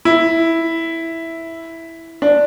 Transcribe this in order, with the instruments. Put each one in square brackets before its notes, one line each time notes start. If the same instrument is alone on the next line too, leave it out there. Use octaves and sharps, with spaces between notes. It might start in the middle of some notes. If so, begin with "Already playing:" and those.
[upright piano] E4
D4